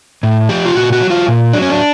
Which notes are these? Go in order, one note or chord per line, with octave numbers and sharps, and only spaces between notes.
A2
F3 G4
F4
A#2 F#4
F#4
F#3
F4
A#2
F#3 D4
C#4
D4